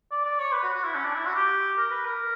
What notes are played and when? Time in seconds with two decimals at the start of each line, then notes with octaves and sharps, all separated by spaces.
0.11 D5
0.25 D5
0.39 C#5
0.52 B4
0.63 F#4
0.73 F#4
0.84 E4
0.95 C#4
1.05 D4
1.14 E4
1.26 F#4
1.35 G4
1.78 A#4
1.91 B4
2.05 A#4